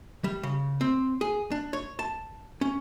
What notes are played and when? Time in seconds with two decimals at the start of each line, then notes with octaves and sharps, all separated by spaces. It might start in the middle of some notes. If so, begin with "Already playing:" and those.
0.24 G3
0.43 C#3
0.81 C4
1.21 G#4
1.51 D4
1.73 C#5
1.99 A5
2.61 C#4